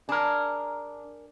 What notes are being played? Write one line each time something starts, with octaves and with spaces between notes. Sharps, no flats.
D4 G#4 A#4